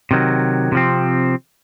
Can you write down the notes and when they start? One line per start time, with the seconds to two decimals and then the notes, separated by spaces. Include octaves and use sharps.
0.11 C3 D#3 F#3
0.72 C3 F3 C4